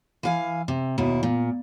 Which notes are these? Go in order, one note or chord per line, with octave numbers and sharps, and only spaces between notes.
E3 F5 G#5
C3
D#2 B2 E4
A#2